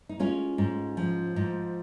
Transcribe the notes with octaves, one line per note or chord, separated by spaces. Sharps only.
D#4
G#3 C#4 F4
G#2
F3
G#2